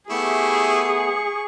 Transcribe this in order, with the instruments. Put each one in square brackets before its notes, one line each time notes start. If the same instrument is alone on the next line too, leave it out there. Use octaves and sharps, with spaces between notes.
[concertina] A3 B3 [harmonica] E4 G4 [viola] G#4 [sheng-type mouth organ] C#6